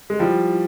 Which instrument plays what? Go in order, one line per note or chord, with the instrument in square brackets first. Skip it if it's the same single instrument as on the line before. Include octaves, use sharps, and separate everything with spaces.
[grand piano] G#3
[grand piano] F3 G3 [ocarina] E4